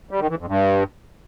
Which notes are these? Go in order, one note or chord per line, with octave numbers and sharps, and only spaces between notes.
G3
D#3
E3
F2
G2